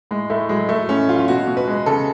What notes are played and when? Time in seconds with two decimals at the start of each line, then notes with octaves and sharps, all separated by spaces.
0.11 A2 G#3
0.30 A2 A3
0.49 F#3 G#3
0.69 A2 A3
0.89 A2 C#4
1.08 F#3 F4
1.18 F4
1.28 B2 F#4
1.47 B2
1.57 B4
1.68 G#3
1.86 C#3 A4